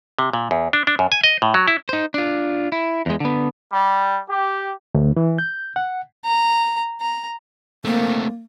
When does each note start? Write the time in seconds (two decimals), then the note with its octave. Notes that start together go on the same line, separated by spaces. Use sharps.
0.19 C3
0.33 A#2
0.51 E2
0.73 D4
0.87 D4
0.99 F#2
1.12 G#5
1.24 D#5
1.42 A2
1.54 F#3
1.68 E4
1.89 D#4 C5
2.14 D4 F4
2.72 E4
3.06 E2 G#3
3.20 D3 B3
3.72 G3
4.28 G4
4.95 D2
5.17 E3
5.38 G6
5.76 F#5
6.26 A#5
7.01 A#5
7.85 A3 A#3 C4